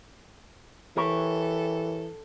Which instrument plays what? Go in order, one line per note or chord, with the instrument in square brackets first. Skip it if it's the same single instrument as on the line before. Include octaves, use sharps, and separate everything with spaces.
[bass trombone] E3 [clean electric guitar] G4 A#4 C#5 [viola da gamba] A4